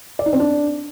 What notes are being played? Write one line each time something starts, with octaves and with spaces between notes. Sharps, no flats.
D5
D#4
C4
D4